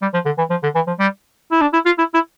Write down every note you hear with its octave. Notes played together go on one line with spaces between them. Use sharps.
G3
F3
D3
E3
F3
D3
E3
F3
G3
E4
D4
E4
F4
E4
E4